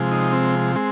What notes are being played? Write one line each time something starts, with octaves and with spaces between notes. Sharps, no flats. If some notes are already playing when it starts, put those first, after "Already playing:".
Already playing: C3 F3 G#3
D#4
C4
G#3 C4